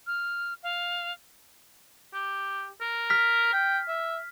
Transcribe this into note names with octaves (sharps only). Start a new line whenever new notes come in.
F6
F5
G4
A#4
F6 B6
G5
E5